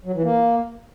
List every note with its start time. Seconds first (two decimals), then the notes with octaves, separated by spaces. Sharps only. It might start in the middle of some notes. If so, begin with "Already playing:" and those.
0.05 F#3
0.15 E3
0.24 A#3